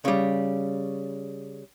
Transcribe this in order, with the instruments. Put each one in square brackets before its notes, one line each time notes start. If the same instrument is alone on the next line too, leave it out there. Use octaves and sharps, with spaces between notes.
[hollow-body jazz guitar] C#3 G3